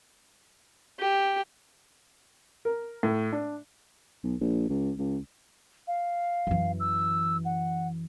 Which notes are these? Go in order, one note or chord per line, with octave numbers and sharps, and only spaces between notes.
G4
A#4
A2
D4
B1
A#1
C#2
C#2
F5
F#2 E3
E6
F#5